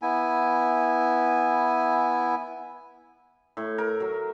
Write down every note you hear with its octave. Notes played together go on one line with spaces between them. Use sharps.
B3 E4 G#5
A2
A#4
F#3